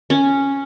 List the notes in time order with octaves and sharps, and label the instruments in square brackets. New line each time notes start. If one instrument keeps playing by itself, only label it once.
[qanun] C#4